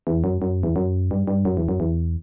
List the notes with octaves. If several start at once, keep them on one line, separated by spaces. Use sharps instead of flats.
E2
F#2
F#2
E2
F#2
G2
G2
F#2
E2
F#2
E2